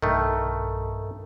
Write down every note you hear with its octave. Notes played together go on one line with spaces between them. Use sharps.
B1 G2 D#3 A3 A4